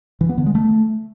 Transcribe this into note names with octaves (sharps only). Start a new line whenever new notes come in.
E3
B3
D3
G#3
A3